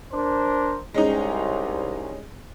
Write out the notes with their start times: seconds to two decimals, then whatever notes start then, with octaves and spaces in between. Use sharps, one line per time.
0.12 D4 A#4 C5
0.94 C2 G#3 C#4 D#4